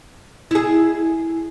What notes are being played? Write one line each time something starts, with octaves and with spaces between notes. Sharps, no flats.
E4 G#4